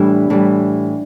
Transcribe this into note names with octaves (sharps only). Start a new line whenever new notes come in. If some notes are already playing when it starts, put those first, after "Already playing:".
Already playing: A2 E3 G3 D4 E4
A2 E3 G3